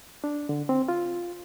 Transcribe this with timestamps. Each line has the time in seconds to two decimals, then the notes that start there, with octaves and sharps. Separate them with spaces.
0.24 D4
0.49 D3
0.69 C4
0.89 F4